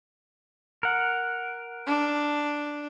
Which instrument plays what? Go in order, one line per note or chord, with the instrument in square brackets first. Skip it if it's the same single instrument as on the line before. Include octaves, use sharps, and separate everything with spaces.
[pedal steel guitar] A#4 F#5
[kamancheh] D4